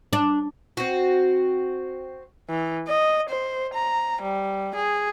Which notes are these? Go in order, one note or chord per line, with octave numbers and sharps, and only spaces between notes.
D4
C4 F#4
E3
D#5
C5
A#5
G3
G#4